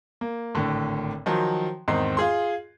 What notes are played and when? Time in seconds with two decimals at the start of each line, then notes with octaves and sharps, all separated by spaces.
0.21 A#3
0.55 G#1 A2 D3
1.26 D#3 F3 F#3
1.88 E2 G#2 D#3 C4 C6 C7
2.17 F4 G#4 C6